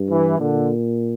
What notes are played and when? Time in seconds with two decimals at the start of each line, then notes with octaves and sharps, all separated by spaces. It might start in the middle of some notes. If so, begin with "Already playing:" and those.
Already playing: G2
0.10 E3
0.39 A#2 D3